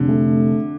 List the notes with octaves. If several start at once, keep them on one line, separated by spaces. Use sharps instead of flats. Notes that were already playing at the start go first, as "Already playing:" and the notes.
Already playing: F1 D3
A3